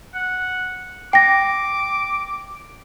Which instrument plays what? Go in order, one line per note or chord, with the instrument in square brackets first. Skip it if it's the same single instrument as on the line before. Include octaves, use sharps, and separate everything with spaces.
[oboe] F#5
[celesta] G5 A#6 [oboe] D6